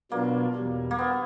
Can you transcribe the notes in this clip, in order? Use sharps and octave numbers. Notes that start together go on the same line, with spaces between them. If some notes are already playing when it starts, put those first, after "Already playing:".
B2 F#3 A#3 B3 D4 F4
E2 B2 G3
A#3
B3